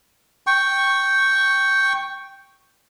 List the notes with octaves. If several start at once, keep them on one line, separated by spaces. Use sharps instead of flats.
G5 C#6